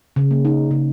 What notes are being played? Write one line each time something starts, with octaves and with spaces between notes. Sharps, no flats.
C#3
A#3
D#4
C#3